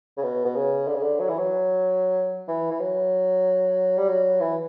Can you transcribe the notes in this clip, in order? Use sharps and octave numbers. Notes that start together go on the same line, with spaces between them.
C#3
B2
B2
C#3
D3
C#3
D3
F#3
E3
F#3
E3
E3
F#3
G3
F#3
E3